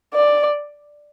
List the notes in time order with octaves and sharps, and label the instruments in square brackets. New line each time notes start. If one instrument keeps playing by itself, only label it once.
[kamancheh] D5